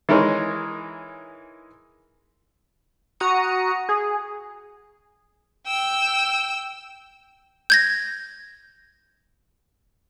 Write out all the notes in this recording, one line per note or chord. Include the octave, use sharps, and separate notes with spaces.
E3 G#3 D#4 A#4 C#5
F#4 A#5 D#6 C#7
G#4
G5 E6
G6 G#6 A#6